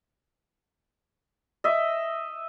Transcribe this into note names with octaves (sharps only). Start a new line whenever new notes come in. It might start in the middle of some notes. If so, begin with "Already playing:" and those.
D#5 E5